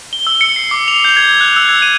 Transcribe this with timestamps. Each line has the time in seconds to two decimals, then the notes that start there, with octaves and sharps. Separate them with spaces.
0.13 G7
0.27 E6
0.41 C#7
0.56 C7
0.71 D6
0.88 F7
1.05 G6
1.16 G#6
1.41 F#6
1.56 E6
1.69 G#6
1.82 D#7